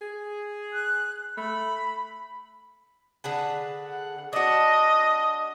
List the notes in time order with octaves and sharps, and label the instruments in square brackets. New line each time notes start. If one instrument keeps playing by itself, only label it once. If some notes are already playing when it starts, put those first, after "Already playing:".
[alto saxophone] G#4
[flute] F#6
[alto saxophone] A3 [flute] B5
[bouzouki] D3 G#4 B4
[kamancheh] F#5
[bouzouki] D4 F#4 [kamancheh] D#5